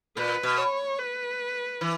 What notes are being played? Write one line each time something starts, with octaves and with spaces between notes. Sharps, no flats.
A#2 B4
B2
C#5
B4
E3